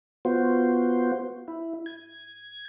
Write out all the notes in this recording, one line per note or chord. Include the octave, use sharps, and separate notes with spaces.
B3 F4 F#4 C5
E4
G#6